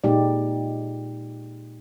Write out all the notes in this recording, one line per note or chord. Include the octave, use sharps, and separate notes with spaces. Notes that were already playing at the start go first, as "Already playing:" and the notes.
A#2 G#3 D#4 G4 D5